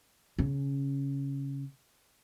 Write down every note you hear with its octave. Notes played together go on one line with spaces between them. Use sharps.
C#3 C#4